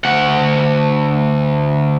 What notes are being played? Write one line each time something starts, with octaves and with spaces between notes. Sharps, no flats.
D2 F#5